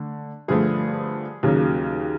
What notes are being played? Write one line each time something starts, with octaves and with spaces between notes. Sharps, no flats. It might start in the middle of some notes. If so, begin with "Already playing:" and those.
Already playing: D3 A3
G2 D3 F3 A3 G#4
D#2 C#3 F#3 A#3